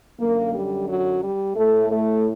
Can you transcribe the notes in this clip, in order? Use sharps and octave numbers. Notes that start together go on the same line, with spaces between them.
F#2 D3 A#3
G3
F#3
G3
A2 A3
A3